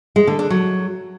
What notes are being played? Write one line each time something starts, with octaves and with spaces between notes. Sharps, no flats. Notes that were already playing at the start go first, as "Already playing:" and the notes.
G#3
D3
D4
F#3